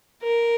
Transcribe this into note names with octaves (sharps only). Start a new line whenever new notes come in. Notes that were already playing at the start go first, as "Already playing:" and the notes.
A#4